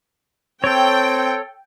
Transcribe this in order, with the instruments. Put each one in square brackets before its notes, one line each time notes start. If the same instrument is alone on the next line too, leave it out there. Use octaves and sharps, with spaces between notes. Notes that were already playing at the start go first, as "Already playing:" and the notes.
[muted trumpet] C4 [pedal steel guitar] A4 C#5 [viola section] G5